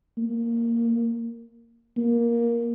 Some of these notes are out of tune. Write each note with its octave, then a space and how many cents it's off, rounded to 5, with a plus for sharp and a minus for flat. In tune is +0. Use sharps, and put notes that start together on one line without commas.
A#3 -5
A#3 +10